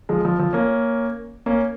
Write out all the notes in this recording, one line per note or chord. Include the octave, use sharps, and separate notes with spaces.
F3 G#3
F3
F3
A#3 C#4
A#3 C#4